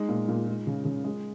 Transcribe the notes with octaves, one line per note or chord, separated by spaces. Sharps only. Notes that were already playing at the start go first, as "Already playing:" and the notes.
Already playing: G#3 D#4
A#2
A#2
G#3
C#3
C#3
G#3